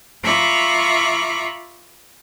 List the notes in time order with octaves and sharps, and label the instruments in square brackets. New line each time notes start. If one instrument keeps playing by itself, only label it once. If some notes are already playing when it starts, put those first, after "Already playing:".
[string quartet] F4 E5 A#5 B5 C#6 D6